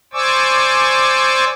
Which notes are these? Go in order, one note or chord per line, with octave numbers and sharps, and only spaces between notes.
C5 D5 G#5 C#6 D6 E6